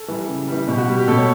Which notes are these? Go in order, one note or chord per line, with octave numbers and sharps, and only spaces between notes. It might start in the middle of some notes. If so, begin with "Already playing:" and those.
Already playing: A4
E3 G3
C#3
E3 G3
B2 G4
F#4
G3
G4
B2 A4
C#5